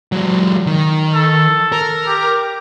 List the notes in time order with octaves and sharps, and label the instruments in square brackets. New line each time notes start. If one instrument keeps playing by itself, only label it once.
[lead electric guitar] F#3 G#3
D#3
[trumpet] A4
[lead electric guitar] A#4
[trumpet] G4